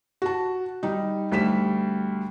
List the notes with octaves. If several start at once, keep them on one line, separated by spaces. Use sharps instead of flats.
F#4 A5
G3 D#4
D2 G3 B6 E7